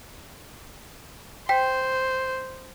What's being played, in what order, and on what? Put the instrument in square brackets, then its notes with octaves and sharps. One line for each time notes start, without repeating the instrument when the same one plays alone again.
[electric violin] C5 [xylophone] G5 B6